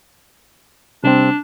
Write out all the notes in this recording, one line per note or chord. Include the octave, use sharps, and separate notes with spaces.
C3 G3 C4 D4